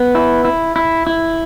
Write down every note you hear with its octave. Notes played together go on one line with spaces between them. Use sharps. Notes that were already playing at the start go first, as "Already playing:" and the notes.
Already playing: B3
E4
E4
E4
E4